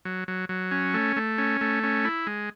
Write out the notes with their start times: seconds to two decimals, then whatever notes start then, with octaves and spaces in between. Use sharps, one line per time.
0.05 F#3
0.28 F#3
0.49 F#3
0.71 C#4
0.94 A3
1.16 A3
1.38 C#4
1.61 A3
1.83 C#4
2.05 E4
2.27 G#3